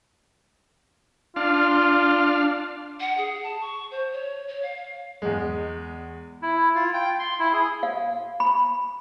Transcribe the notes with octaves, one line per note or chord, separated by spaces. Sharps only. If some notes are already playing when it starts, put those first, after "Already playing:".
D4 F4 F5
F#5
G#4
A5
C#6
C5
C#5
C#5
F5
E2 G#3
E4
F4
G5
C6
E4
G#4
F5
B5